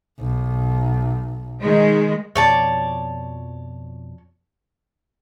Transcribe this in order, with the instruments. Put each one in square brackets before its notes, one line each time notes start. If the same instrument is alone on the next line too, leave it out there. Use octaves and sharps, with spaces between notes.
[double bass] B1
[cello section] D#3 G#3
[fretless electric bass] F2 B2 F3 [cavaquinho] C#5 D5 A5